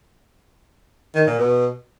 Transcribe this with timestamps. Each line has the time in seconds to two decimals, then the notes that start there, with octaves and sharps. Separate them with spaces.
1.15 D#3
1.27 A#2
1.39 B2